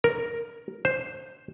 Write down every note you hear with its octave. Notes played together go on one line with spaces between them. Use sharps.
A#4
C5